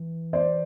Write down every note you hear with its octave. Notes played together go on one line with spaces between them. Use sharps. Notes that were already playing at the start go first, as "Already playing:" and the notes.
Already playing: E3
C5 D5